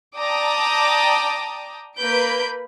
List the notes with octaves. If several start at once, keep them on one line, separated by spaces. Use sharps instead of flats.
D5 G5 A5 A#5 D6 D#6
A#3 B4 B5 G6 D7